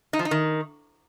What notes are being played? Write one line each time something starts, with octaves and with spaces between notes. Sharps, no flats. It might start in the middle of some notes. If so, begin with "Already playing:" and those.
D#4
F3
D#4
D#3